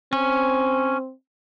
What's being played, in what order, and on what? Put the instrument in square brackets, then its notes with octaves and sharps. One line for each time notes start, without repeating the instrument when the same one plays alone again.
[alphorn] C4 [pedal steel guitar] C#4